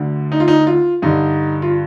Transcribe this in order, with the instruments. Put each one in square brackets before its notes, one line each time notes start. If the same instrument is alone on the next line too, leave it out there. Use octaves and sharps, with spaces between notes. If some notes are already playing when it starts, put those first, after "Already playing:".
Already playing: [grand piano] D2 D3
D#4
F4
D#4
F4
G2 D3 D#4
F4